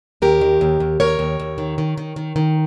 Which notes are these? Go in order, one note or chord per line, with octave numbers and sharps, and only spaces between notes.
D#2 G4 A#4
D#3
D#2
D#2
D#2 A#4 C#5
D#2
D#2
D#3
D#3
D#3
D#3
D#3